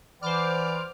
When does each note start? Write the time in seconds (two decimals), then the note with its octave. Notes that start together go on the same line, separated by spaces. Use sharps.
0.22 E3 B4 C5 D5 F#5 B5 D6 F6